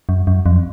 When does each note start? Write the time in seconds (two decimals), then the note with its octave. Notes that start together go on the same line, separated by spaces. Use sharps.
0.09 F#2
0.27 F#2
0.46 F2